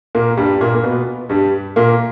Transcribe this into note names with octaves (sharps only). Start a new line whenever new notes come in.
A#2 A#3
G2 G3
A#2 A#3
A#3
B2 B3
G2 G3
A#2 A#3